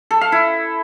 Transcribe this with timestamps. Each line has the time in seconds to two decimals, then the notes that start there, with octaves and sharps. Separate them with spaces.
0.11 A4
0.21 F5
0.32 E4